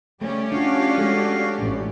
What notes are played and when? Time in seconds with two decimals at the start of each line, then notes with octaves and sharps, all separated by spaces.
0.21 C#3 G3 A3 C#4 G4 D5
0.52 D4 F4 F#4 F5
0.98 G#3 A4
1.58 A1